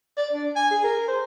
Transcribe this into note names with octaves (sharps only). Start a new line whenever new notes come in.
D5
D4
G#5
G#4
A#4
C5